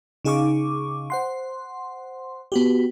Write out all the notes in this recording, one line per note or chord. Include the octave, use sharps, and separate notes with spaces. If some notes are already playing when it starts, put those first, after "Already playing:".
C#3 D#4 G#4 F5 C#6 D6
C5 F#5 C6
B3 F#4 G4